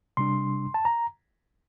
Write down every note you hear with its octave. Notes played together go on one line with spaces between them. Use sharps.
C3 G3 D4 C6
A5
A#5